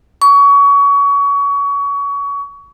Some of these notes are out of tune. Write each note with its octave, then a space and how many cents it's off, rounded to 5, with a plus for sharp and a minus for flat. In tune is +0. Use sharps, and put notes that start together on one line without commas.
C#6 +30